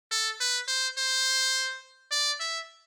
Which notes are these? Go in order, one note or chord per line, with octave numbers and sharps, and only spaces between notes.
A4
B4
C5
C5
D5
E5